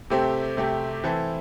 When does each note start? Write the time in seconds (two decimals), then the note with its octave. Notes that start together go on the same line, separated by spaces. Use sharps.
0.10 C3 A3 C4 G4
0.57 C3 A3 C4 G4
1.04 E3 C4 E4 A4